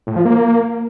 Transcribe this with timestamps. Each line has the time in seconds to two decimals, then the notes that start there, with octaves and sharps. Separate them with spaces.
0.07 A2
0.16 F3
0.25 A#3